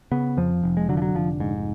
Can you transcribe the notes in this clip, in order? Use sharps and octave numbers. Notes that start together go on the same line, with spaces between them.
C#3 B3
F2 F3
F1
G#3
D3 F#3
F3
F#3
F1 F3
G#2